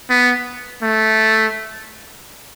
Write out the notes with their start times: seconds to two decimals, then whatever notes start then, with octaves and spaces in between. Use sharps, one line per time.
0.10 B3
0.82 A3